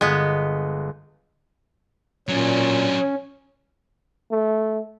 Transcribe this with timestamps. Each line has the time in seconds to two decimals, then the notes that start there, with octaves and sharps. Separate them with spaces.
0.01 G1 G#3 B3
2.28 A#2 F#3 C#4 D4
4.31 A3